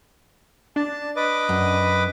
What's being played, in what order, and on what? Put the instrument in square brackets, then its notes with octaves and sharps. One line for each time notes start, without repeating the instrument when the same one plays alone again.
[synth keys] D4 [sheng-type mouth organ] A5
[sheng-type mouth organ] B4 D#5 D6
[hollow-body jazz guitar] F#2